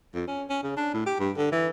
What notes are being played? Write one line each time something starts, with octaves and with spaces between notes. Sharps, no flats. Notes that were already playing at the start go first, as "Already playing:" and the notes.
F2
C#4
C#4
C#3
D4
A2
G4
G2
D3
E3